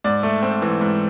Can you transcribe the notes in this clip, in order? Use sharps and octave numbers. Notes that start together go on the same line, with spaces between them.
G#2 D5
A3
C4
E3
G#2